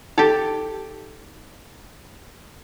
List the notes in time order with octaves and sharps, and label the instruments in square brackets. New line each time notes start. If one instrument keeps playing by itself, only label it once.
[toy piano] D#4 [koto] G4 A4